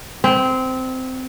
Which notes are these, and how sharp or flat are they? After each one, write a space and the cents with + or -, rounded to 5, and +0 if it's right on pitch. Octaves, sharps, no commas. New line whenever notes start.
C4 -15